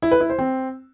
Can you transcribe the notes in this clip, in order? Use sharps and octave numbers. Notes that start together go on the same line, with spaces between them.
E4
B4
E4
C5
C4